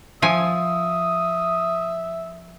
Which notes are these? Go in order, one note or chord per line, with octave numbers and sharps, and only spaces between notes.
F3 E5 G#5 D#6